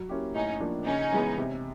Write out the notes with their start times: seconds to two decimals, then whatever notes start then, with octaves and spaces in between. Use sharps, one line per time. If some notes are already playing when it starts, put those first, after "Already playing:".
Already playing: F#3
0.09 A#3 C#4 E4 G4
0.35 A2 C#4 D#4
0.60 F3 A#3 D4
0.86 C#3 C#4 D#4
1.12 E3 G#3 B3
1.38 C3